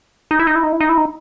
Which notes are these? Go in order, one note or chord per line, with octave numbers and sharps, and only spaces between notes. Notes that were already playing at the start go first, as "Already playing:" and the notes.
D#4
E4
D#4
E4
D#4
E4
D#4
E4
D#4